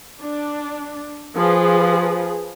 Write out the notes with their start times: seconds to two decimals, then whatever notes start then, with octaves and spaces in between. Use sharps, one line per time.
0.23 D4
1.36 F3 G#4 B4